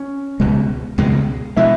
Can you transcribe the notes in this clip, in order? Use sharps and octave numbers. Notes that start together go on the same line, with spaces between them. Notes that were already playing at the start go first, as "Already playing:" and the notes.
Already playing: C#4
C#2 B2 G#3
C#2 B2 G#3
B2 G#3 E4